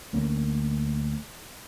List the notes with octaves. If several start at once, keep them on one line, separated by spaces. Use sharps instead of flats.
D2 A#3 C#4